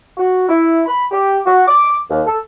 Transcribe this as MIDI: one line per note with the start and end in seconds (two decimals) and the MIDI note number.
0.17 0.48 66
0.49 0.82 64
0.85 1.05 83
1.11 1.39 67
1.46 1.62 66
1.67 1.96 86
2.10 2.21 39
2.27 2.38 69